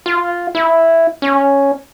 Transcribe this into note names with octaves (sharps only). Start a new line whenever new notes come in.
F4
E4
C#4